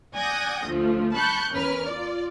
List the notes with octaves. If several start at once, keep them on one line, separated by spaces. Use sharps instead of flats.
D5 F#5 G#5 D#6 G6 A#6
D2 F3 A3
A5 B5 C#6 F#6 G6 C#7
E2 C#4 A#4 B4 F6
F4 D5